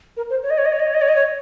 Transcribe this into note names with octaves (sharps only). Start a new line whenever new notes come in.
A#4
C5
C#5
D#5
C#5
D#5
C#5
D#5
C#5
D#5
C#5
D#5
C#5